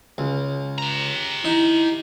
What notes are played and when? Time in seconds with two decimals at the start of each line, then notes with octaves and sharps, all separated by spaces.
0.18 C#2
0.78 G4 A#5
1.45 D#4 E4